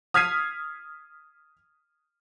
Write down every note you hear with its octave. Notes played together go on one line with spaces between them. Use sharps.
D#6 F6 G#6 B6 C7 D#7